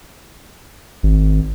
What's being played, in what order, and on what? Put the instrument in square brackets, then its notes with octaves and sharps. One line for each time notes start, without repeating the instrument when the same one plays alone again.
[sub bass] G#1